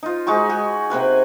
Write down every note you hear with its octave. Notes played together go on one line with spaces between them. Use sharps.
D#4 F4
G#3 D#4 F#4 C#6
F#4 G#4
C3 A#3 B4 G#5